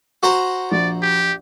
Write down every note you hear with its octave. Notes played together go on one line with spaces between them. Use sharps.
F#4 C5 A#5
A#1 D5
G4